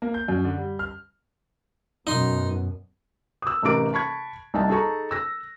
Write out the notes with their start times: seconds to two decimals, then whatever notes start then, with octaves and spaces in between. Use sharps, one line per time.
0.02 A#3
0.14 G6
0.28 F#2
0.44 D3
0.58 G3
0.79 F6
2.07 F#2 B2 D#4 C6
3.42 D#6 E6
3.63 A1 C3 D#4 A#4 D6 D7
3.93 A5 B5 C#6 G#6
4.54 C2 D#4 G#5 A5
4.69 D#4 G#4 A4 A5 A#5 C#6
5.11 E6 A#6